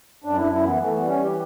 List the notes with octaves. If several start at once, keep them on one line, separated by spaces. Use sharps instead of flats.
F#2 D4
E4
F#2
E4
E3 B3
E3 A3
B3
G3
C#4
E3
G4